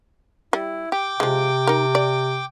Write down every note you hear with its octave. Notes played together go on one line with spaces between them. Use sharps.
G3 E4
G4 G5 D6
C3 F3 G#3
D#4 A#4
D5